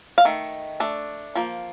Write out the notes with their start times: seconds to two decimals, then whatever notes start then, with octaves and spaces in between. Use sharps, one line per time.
0.18 F5
0.25 D#3 A3
0.80 A3 D4
1.35 F3 A#3